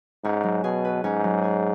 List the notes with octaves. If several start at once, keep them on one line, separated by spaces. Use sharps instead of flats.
G#2 C#4
F#3
B2 G#4
B4
G#2 C#4
F#3
G#4